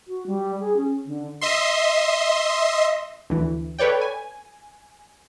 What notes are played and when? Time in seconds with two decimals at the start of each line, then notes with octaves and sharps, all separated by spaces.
0.08 F#4
0.27 G3
0.60 G#4
0.77 C#4
1.06 D3
1.41 D#5 E5 C6
3.30 D2 E3
3.79 A4 B4 C#5 D5 G5
4.01 G#5